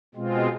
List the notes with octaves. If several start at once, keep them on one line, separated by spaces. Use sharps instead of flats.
B2 G#3 C4 F4